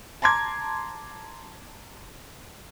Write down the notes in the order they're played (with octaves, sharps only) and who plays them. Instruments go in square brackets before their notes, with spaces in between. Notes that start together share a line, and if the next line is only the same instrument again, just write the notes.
[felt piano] A5 A#5 C6 D6 G#6